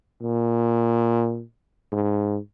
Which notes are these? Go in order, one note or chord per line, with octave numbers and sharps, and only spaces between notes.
A#2
G#2